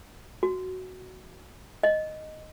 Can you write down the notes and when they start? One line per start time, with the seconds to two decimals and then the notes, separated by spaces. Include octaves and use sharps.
0.43 F#4
1.83 D#5